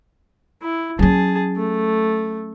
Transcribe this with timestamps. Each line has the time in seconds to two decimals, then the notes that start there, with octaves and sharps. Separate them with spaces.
0.62 E4
0.99 F#3 C#4 G#4 A5
1.56 A3